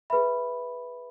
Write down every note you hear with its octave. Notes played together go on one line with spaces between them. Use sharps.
G#4 B4 E5 B5